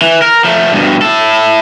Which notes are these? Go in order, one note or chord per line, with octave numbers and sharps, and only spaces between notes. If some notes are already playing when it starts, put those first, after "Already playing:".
E3
A#4
F3 A3
G2 B2
E4 A4